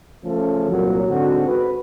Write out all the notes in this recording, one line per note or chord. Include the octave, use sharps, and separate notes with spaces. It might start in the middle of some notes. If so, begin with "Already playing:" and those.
C#3 F3 A3 C#4 A4
C2 A#2 F#3
G#2 D3 C4 F#4
B4